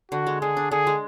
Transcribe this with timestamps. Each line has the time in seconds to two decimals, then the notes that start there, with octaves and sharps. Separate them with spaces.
0.12 D3 F#4
0.27 G#3
0.41 D3 G#4
0.57 D4
0.71 D3 G#4
0.87 G#3